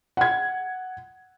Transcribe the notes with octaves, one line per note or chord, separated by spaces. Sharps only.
F#5 G#6